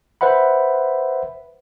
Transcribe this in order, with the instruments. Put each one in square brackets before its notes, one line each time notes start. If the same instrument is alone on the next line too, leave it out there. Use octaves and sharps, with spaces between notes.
[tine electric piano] B4 C5 E5 F#5 B5